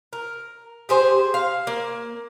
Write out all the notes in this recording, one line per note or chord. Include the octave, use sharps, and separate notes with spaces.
A#4
G4 G#4 C5
F5
A#3